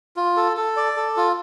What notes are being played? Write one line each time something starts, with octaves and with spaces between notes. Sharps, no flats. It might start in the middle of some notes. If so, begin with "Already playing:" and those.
F4
A4
A4
D5
A4
F4